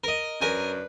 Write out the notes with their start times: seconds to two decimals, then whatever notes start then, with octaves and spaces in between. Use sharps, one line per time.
0.04 A#4 D#5
0.41 F#2 D4 A#4 B4 G#5